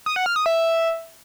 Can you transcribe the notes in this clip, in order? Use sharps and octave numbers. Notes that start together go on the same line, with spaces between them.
D#6
F#5
F6
D#6
E5